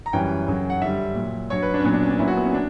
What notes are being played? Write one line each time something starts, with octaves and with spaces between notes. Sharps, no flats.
A#5
F#2 E3 G3 G5
F#2 C#3 F#3
F#5
G2 D3 G3 E5
A#2 F#3
G2 F#3 C#5
B4
D4
C#4
A#2 F#3 B3
D4
C#4
D4
A#2 F#3 E4
F#4
B3
C#4
D4